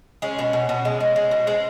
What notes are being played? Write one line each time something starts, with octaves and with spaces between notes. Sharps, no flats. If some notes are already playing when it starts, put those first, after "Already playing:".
G#3 C#4
B2
B2
B2
G#3
G#3
G#3
B2
G#3 C4